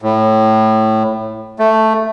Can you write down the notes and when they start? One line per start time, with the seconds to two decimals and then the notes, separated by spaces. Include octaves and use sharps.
0.02 A2
1.59 A3